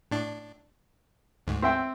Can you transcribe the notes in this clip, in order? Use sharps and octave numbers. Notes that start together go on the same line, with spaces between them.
A2 D4
D2 G#2
C4 E5 G5